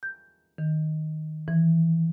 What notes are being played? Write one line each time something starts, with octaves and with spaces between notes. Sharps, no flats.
G6
D#3
E3